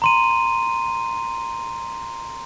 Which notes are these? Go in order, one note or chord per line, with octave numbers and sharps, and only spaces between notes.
A#5 C6 D#7